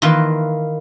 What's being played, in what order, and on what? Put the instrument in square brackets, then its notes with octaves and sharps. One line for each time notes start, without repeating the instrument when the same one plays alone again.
[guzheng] D#3 E3 A#3 F4 B4